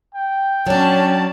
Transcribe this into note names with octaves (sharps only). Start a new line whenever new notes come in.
G5
F#3 C#4 D4 C#5 A5